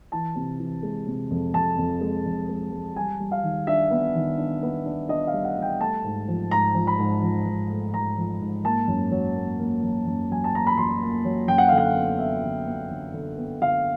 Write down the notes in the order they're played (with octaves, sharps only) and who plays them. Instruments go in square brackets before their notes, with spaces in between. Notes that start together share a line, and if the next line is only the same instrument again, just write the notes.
[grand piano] E3 A5
C3
E3
G#3
C3
F2
F2 A5
F2
G#3
F2
G#3
G#3
G3 G#5
G3
F5
D#3
D4 E5
B3
D#3
D4
B3
D4
D4 D#5
F5
G3
F#5
G3
G5
A3 A5
G#2
F3
G#2 A#5
F3
B5
G#2
F3
G#2
A3
G#2 A#5
F3
G#2
A#3 A5
F#2
F#3
A#3
A#3
F#3
F#2
F#3 G#5
A5
A#3 A#5
B5
F#2 C6
A#3
F#3
F#2 G5
F#5
D3 F5
F#5
B3
B3 E5
D3
B3
D3
D3
B3
D3 F5